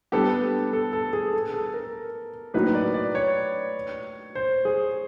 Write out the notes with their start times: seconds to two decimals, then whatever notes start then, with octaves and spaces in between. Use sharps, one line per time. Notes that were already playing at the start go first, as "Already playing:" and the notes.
0.12 G3 B3 D4 G4 A4
0.73 A4
0.93 A4
1.13 G#4
1.33 A4
1.54 A4
1.74 A#4
2.54 A2 F#3 A#3 D#4 F#4 B4
2.75 D5
2.94 D5
3.15 C#5
4.35 C5
4.65 G#4